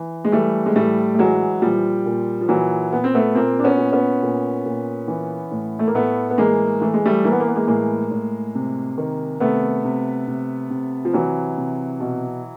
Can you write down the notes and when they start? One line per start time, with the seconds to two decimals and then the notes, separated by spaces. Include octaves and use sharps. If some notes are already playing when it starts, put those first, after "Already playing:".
Already playing: E3
0.25 G#3
0.32 E3 G3 A3
0.66 G#3
0.76 A2 G3 A3
1.14 A3
1.19 E3 F#3 G#3
1.62 A#2 F3 G3
2.06 A#2
2.41 F3
2.49 A#2 E3 F#3
2.92 A#2 B3
3.04 C4
3.14 A3 B3
3.35 A#2 A#3 C4
3.59 D4
3.64 B3 C#4
3.78 A#2
3.92 B3 C#4
4.22 A#2
4.66 A#2
5.08 E3
5.51 A2
5.79 A3
5.87 A#3
5.95 A2 A3 B3
6.30 B3
6.38 E3 G#3 A#3
6.81 E3 A3
6.94 G#3
7.06 G3 A3
7.25 E3 A#3
7.32 B3
7.40 A#3
7.48 B3
7.55 G#3 A#3
7.67 A2 G#3 A#3
8.11 A2
8.55 C3
8.98 D#3
9.40 C3 A3 B3
9.85 C3
10.28 C3
10.70 C3
11.05 F3
11.14 C3 E3 F#3
11.57 C3
12.00 B2